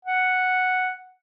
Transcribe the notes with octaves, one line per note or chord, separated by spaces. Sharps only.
F#5